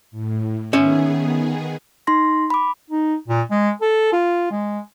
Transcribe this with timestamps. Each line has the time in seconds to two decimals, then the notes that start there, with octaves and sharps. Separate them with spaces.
0.11 A2
0.73 D#3 B3 C#4 G#4 E5
2.07 D#4 C6 A#6
2.50 B5 D6
2.90 D#4
3.28 A#2
3.51 G#3
3.81 A4
4.13 F4
4.51 G#3